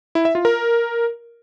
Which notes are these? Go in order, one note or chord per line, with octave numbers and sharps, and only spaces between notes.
E4
E5
F4
A#4